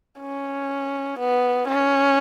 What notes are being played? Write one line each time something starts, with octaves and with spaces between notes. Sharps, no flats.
C#4
B3
C#4